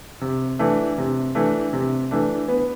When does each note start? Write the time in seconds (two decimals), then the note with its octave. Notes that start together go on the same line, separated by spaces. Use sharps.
0.21 C3
0.59 E3 A3 D4
0.98 C3
1.35 E3 A3 D4
1.73 C3
2.11 E3 A3 D4
2.48 B3